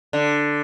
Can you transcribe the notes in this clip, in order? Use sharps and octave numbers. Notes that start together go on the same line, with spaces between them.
D3